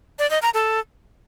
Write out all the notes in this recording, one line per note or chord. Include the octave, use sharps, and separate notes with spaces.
D5
D#5
A#5
A4